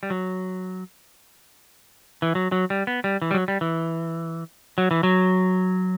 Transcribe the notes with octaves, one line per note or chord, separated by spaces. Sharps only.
G3
F#3
E3
F#3
F#3
G3
B3
G3
E3
G3
F#3
G3
E3
F#3
E3
F#3